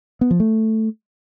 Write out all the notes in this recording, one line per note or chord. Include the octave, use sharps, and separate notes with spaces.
B3
F3
A3